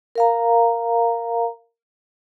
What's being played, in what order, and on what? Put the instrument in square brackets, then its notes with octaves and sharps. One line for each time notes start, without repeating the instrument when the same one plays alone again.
[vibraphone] A#4 F5 A#5